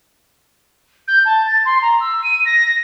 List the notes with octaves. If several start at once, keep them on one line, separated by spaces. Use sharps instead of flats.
G6
A5
A6
C6
A#5
E6
D#7
A#6